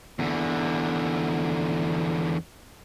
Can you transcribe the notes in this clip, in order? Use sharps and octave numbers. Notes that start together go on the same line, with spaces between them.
E2 D3